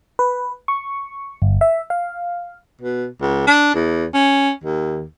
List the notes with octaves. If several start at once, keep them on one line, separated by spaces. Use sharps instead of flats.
B4
C#6
G1
E5
F5
B2
C#2
D4
E2
C#4
D#2